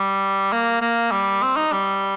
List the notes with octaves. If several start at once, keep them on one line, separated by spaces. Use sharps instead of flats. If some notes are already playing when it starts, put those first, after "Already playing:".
Already playing: G3
A#3
A#3
G3
C4
D#4
G3